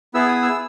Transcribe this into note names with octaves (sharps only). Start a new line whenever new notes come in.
B3 E4 G#4 E6
D#6
E6